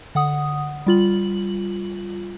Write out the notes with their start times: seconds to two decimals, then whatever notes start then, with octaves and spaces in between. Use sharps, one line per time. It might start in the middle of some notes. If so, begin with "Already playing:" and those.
0.15 D3 F#5 D#6
0.87 G3 F4 F#7